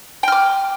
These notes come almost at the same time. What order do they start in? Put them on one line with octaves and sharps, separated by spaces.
G5 F6 D6